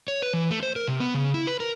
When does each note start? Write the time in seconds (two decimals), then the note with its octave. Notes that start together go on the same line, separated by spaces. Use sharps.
0.08 C#5
0.22 B4
0.33 E3
0.51 A3
0.63 C5
0.76 A#4
0.87 C3
1.00 B3
1.14 C#3
1.34 E4
1.47 B4
1.60 A#4